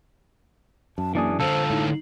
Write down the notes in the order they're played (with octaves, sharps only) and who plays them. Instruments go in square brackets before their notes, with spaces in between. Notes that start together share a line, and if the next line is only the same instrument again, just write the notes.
[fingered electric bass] F#2 [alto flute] A5
[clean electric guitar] E3 D4 G#4 [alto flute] A#3
[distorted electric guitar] D3 F4 [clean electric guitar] A4 [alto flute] C5
[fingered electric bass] A2 [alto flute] D#4